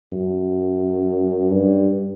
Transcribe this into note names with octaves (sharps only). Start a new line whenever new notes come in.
F#2
G2